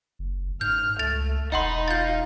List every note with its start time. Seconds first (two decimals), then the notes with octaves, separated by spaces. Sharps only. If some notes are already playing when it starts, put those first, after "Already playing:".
0.19 F#1
0.61 G#2 F6 G6
0.99 C#2 A3 A6 F7
1.52 E1 D#4 D#5 F#5 B5 C6
1.88 F4 F5 G6 A6